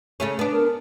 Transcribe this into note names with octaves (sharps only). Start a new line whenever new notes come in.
C#3 A3 C#4
B3 D4
A#4